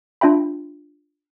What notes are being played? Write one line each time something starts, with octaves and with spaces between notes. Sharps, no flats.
D4 F4 E5 G5 B5